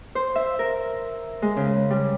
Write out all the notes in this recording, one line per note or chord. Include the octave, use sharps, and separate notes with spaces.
C5
E5
A#4
G#3
C#3
G3